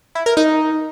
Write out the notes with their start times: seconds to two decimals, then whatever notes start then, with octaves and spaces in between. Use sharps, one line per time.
0.15 E4
0.26 A#4
0.37 D#4